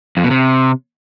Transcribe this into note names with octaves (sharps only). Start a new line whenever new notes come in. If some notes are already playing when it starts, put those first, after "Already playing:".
F2
B2
C3